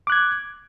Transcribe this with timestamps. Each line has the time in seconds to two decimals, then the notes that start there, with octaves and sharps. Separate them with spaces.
0.07 D6
0.10 F#6
0.12 G#6